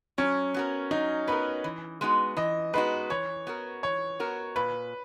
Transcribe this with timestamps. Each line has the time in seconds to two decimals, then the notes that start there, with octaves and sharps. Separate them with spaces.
0.18 F#3 C#4
0.54 B3 F#4 A#4
0.91 F#3 D#4
1.27 B3 F#4 A#4 B4
1.64 E3
2.01 G#3 B3 D#4 F#4
2.37 E3 D#5
2.73 G#3 B3 D#4 F#4 B4
3.10 E3 C#5
3.47 B3 F#4 A#4
3.83 E3 C#5
4.20 B3 F#4 A#4
4.56 A#2 B4